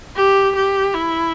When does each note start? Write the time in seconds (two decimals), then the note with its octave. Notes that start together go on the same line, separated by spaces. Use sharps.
0.16 G4
0.56 G4
0.94 E4